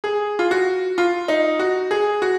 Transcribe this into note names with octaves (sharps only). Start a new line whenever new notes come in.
G#4
F4
F#4
F4
D#4
F#4
G#4
F#4